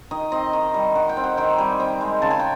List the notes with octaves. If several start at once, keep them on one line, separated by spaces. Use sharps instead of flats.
D#3 D#5
C4 D#5
D#3
G3
D#3 F#5
G5
C4
F#5
D#3 G5
G3 G#5
C4 G5
G#3
C#3 A5
G#5
G5